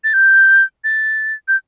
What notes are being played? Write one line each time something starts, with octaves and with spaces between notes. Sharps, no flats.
A6
G6
A6
G6